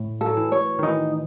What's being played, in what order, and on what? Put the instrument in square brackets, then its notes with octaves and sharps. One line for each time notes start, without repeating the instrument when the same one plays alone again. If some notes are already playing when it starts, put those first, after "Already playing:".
Already playing: [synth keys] A2
[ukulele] A4
[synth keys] F#3
E3
[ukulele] C#5
[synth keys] D#3
[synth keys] E3 [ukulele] D#4